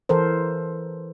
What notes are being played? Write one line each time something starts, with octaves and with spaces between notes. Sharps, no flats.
E3 A4 A#4 C5